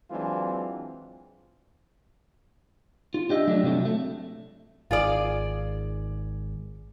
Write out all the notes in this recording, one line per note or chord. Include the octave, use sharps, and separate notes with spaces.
E3 F#3 G#3 C4 D4 F4
F4
D4 G4 D#5 E5
F#3 A3 D4 G4
C3 F3 F#3 A3
A3
G#1 F4 G#4 D5